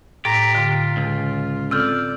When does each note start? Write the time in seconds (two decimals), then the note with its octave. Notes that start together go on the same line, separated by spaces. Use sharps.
0.25 A2 G4 A#5 A6 B6
0.55 D3 F4
0.97 C#2
1.71 C4 F4 A4 D5 E6 F6 G6